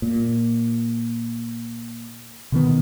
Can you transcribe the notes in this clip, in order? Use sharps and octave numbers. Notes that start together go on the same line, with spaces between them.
A#2
B2 D#3 B3